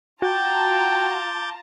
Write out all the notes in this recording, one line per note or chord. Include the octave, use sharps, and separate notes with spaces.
F4 F#4 G5 A5 A#5 D6 G6 A6